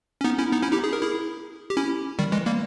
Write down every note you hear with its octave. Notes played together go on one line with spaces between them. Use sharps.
C#4
B3 D#4
C#4 E4
B3 D#4
C#4 E4
D#4 G4
G#4
A#4
E4 G#4
G4
C#4 E4
D#3 G3
E3 G#3
G3 A#3